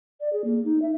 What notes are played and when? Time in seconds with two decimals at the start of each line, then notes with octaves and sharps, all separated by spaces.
0.20 D5
0.33 G#4
0.44 A#3
0.65 D#4
0.82 E5